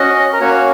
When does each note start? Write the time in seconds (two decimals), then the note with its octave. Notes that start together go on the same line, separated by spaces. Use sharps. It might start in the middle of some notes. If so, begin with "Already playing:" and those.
Already playing: C#4 F#4 D#5
0.33 A#4
0.40 A#3 C#4 F#4 C#5